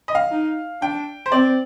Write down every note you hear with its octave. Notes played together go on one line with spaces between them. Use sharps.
D#5
F5
D#4
D4 G5
C5
C4 D5